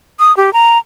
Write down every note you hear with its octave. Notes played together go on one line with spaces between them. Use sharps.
D#6
G4
A#5